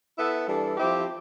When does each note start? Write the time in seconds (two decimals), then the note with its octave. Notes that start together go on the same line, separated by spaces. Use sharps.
0.18 B3 E4 A4 E5
0.47 E3 G3 D4 A4
0.76 F3 C4 E4 G4